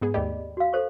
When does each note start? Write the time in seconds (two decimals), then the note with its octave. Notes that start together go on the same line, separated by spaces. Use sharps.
0.01 G#2 B3 G#4
0.14 D#2 A3 G4 D5 D#5 B5
0.57 F#4 F5
0.73 A4 C5 C#6